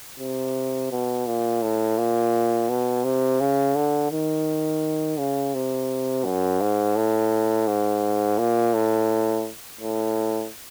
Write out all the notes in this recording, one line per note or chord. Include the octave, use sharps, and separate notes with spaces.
C3
B2
A#2
A2
A#2
B2
C3
C#3
D3
D#3
C#3
C3
F#2
G#2
A2
G#2
A#2
A2
A2